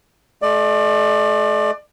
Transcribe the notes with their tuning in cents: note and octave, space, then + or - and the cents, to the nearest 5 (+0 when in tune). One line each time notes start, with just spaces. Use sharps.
A3 -40 D5 +25